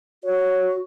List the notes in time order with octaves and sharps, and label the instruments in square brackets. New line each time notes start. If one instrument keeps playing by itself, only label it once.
[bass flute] F#4 [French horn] C#5